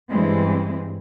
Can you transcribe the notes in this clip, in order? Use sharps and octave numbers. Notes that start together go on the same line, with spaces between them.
G2 E3 G#3 C4